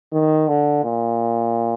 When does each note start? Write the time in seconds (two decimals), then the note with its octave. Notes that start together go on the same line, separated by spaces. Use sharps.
0.12 D#3
0.48 D3
0.84 A#2